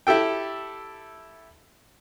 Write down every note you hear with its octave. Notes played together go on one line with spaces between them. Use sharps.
E4 G4 A4 G5